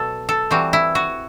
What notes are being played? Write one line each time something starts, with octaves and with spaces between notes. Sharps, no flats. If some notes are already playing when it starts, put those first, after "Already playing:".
Already playing: B2 F#3 A4
A4
E3 G3 C4 F#4
E4
F#4